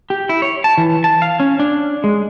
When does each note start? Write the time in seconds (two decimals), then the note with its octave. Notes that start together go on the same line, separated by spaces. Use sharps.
0.10 G4
0.29 E4
0.42 C#5
0.64 A5
0.78 E3
1.04 A5
1.22 F5
1.40 C#4
1.60 D4
2.04 G#3